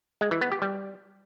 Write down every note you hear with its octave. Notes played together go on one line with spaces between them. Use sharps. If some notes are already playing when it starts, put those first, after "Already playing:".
G#3
E3
B3
G4
G3